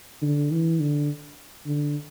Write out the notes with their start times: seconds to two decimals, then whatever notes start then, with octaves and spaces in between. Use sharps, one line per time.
0.22 D3
0.51 E3
0.80 D3
1.66 D3